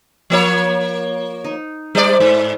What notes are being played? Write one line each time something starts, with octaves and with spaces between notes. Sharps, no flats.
F3 A#3 C#5
D#4
G3 C5 D5
G#2 E5 A#5 C#6